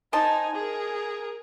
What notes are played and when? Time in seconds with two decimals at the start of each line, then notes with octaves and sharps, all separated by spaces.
0.13 D#4 C5 D#5 G#5 A5
0.55 G#4 A#4